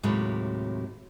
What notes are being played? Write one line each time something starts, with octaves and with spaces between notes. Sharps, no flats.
D#2 A2 C3 F#3 G#3